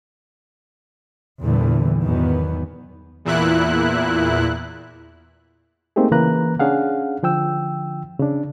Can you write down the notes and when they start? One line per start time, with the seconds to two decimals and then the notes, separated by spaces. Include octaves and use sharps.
1.42 E2 A#2 D3 E3 G3
2.01 E2 G#2 B2 D#3 F#3 B3
3.25 E2 A#2 E4 F#6
5.96 A3 A#3 C4 D#4 G4 G#4
6.12 C#3 E3 A#3 B4 A#5 F#6
6.59 C#4 D4 G#4 F5 F#5
7.23 D3 F3 G5 E6
8.20 C#3 D4